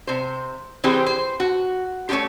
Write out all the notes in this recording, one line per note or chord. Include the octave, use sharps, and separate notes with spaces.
C3 C5
E3 C4 G4 G#4 C5
C5
F#4
A3 C#4 D#4 F4 G4